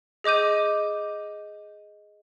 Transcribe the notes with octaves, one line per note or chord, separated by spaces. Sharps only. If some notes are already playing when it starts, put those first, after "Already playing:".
G#4 D#5 D6 G6 D#7